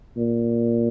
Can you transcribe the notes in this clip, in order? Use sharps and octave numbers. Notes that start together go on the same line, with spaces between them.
A#2